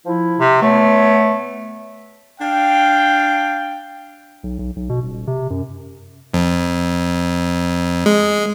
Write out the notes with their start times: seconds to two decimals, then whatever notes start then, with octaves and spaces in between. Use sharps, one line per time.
0.06 F3 E4
0.39 C3
0.62 A3 B3 C#5
2.41 D4 F5 G5
4.44 B1
4.59 B1
4.76 B1
4.89 B2
5.03 D#1
5.27 C3
5.50 F#2
6.34 F2
8.06 G#3